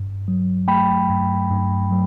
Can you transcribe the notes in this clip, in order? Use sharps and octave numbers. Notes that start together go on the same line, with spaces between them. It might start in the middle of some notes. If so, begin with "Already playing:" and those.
Already playing: G2
F#3
A3 G5 B5
G2
G2
F#3